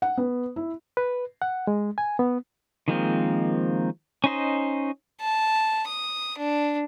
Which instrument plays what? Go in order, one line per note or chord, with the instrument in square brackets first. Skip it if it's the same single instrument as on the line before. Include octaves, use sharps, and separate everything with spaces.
[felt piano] F#5
B3
E4
[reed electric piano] B4
F#5
G#3
G#5
B3
[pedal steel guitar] D#3 F3 G#3 A#3 C4
C#4 D#4 C5 D#5
[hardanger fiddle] A5
D#6
D4